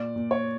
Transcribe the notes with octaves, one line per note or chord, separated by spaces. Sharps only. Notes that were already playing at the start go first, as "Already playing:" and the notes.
Already playing: A#2 D5
A#2
C#5